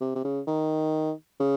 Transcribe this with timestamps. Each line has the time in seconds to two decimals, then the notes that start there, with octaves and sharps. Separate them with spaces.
0.01 C3
0.15 C3
0.25 C#3
0.47 D#3
1.40 C#3